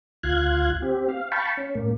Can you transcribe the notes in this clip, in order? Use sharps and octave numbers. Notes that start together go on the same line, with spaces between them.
D2 F4 F5 F#6 G#6
C4 G4
F5
F5 G5 A5 B5 C#6
C#4
A2 A#3